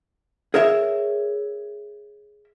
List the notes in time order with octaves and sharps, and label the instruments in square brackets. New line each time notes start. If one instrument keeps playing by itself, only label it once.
[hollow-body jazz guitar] G#4 A#4 C#5 E5